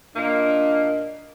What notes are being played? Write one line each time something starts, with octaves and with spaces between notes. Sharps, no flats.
A#2 A#3 D4 D#5